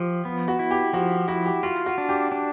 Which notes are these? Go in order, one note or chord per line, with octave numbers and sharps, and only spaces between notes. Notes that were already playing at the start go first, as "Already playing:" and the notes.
Already playing: F3 G4
B3
F#4
E4
G4
F3 F#4
E4 F#4
G4
F4 F#4
F#4
D4
G4
D4